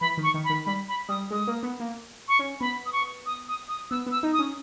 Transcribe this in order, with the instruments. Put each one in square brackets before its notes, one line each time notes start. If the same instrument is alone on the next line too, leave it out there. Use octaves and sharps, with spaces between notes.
[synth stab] E3 [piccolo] B5
[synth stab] D#3
[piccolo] C#6
[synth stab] D#3
[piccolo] B5
[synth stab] D#3
[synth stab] G3 [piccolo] B5
[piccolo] B5
[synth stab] G3 [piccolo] D#6
[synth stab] G#3 [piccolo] D#6
[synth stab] A#3
B3
A#3
[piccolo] C#6
[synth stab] C#4
[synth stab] B3 [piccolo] B5
[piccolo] D#6
C#6
D#6
D#6
D#6
[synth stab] B3 [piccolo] E6
[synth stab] B3
[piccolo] E6
[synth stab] D#4
[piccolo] D#6
[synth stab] C#4